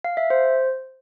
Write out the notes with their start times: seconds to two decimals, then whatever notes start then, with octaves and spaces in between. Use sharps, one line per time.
0.04 F5
0.17 E5
0.30 C5